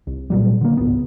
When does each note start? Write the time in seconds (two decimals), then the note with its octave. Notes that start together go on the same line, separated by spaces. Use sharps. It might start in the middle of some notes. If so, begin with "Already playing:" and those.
0.07 C2
0.30 A#2 F#3 G3
0.61 D3 A#3
0.77 G#1 C#2 B3